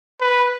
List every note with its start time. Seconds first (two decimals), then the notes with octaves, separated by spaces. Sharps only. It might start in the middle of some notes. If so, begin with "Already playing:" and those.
0.21 B4